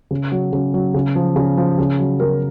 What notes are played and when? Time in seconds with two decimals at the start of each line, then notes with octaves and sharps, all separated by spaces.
0.11 C#3
0.32 F#3
0.53 C#3
0.74 F#3
0.94 C#3
1.15 F3
1.36 C#3
1.58 F3
1.79 C#3
1.99 F#3
2.20 C#3 A#4